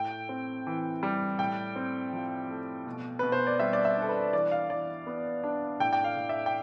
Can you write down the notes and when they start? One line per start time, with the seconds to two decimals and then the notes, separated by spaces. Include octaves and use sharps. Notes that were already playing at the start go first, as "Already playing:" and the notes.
Already playing: A2 G5
0.29 C4
0.67 E3
1.03 G3
1.39 A2 G5
1.76 C4
2.13 F3
2.49 A3
2.87 B2
3.19 B2 B4
3.32 C5
3.47 D5
3.60 G3 E5
3.73 D5
3.85 E5
3.97 D4
4.02 A4
4.09 B4
4.33 E3 D5
4.51 F5
4.70 E3 D5
5.07 B3
5.44 D4
5.80 A2 G5
5.93 G5
6.04 F5
6.17 A2
6.29 E5
6.46 G5